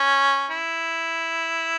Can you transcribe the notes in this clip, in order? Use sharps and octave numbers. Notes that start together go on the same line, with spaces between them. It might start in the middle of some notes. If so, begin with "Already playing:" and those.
Already playing: C#4
E4